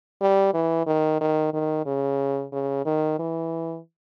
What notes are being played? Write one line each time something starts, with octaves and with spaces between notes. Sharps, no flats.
G3
E3
D#3
D#3
D#3
C#3
C#3
D#3
E3